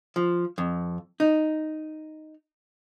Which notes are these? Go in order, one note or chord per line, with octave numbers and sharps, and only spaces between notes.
F3
F2
D#4